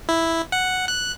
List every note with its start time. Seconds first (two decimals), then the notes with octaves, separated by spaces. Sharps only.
0.09 E4
0.52 F#5
0.88 F#6